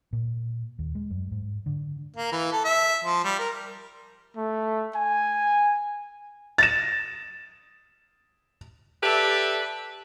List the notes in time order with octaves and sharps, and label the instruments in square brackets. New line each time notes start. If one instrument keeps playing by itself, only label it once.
[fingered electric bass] A#2
D#2
G#3
F#2
G#2
D3
[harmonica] A#3
E3
A4
E5
F3
G3
A#4
[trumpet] A3
G#5
[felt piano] A6 A#6 E7
[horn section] G4 A4 B4 D5 E5